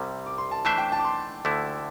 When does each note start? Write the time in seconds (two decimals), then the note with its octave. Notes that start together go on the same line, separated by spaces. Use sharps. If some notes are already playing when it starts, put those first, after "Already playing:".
Already playing: C2 C3 G3
0.26 D6
0.38 C6
0.51 A5
0.65 E3 A3 D4 C5 E5 A5
0.78 G5
0.92 A5
0.99 D6
1.04 C6
1.45 D2 D3 A3 E4